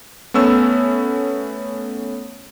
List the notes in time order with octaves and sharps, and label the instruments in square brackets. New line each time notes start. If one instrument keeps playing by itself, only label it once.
[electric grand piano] A3 B3 C#4 E6